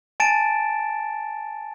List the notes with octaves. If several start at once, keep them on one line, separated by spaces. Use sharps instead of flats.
G#5 A5 A6 D7 E7